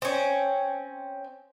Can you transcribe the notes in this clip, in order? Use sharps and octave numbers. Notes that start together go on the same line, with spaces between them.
C4 C#4